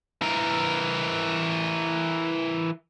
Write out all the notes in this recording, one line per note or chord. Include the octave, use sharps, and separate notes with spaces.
E3 A#4